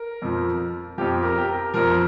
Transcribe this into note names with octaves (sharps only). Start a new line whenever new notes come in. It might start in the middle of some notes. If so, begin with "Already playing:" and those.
Already playing: A#4
F2 F3
F2 F3 G4
A#4
G4
A#4
F2 F3 A#4